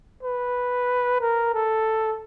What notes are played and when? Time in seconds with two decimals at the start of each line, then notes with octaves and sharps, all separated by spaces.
0.23 B4
1.21 A#4
1.54 A4